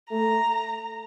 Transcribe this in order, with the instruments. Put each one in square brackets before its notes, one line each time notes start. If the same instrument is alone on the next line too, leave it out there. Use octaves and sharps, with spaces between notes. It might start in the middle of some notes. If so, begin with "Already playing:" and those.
[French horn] A3 [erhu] A#5